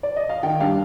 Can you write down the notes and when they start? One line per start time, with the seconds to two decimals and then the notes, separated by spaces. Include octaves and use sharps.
0.03 D5
0.16 D#5
0.29 F5
0.43 D#3 G5
0.60 G3 D4 F5